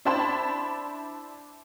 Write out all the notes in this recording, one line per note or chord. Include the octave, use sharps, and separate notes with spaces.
D4 E4 C5 A5 B5 C6